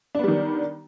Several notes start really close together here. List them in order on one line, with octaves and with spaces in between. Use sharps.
D4 B3 G3 D#3